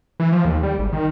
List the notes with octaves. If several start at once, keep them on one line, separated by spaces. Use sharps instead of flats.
E3
F3
D#2
G3
G#1
D#3